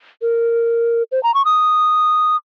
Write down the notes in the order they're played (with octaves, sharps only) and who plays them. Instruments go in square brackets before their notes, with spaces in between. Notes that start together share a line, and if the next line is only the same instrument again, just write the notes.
[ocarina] A#4
C5
A#5
C#6
D#6